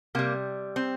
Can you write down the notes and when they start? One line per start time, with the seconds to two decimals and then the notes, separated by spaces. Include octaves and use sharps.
0.15 C3 G3 A#3
0.76 C4